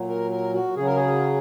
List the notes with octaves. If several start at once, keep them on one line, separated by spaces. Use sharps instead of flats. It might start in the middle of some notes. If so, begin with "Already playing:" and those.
Already playing: A#2 F#3
A#4
A#4
F#4
C#3 F#3 G#4
A#4
G#4